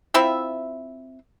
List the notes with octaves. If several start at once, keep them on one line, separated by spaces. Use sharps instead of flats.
C4 E4 F4 E5